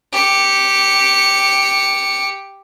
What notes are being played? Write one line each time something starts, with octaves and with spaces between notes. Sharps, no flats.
G4 C#7